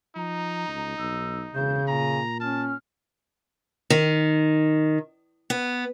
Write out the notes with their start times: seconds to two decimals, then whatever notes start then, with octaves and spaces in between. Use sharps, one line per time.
0.16 F3 D#4 A#5
0.68 C#2
0.98 B1 E6
1.54 E1 C#3 G6
1.88 A#2 G#5 A#5
2.40 C#4 A5 F6
3.90 D#3
5.50 B3